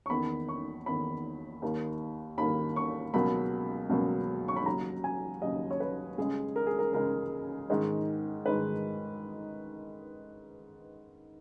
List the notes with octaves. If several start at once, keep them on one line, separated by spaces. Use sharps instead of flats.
C#6
E2 D#3 A#3 B5
C#6
E2 D#3 A#3 B5
D#2 D#3 A#3
D#2 D#3 A#3 B5
C#6
C#2 B2 F#3 A#3 B5
C#2 B2 F#3 A#3
C#6
B5
D#2 C#3 F#3 A#5
G#5
D#2 C#3 F#3 D#5
C#5
B4
C#2 C#3 G#3 G#4
A#4
G#4
A#4
C#2 C#3 G#3 A#4
G#2 D#3 G#3
G#2 D#3 G#3 B4